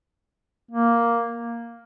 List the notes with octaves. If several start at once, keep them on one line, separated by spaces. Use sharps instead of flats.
A#3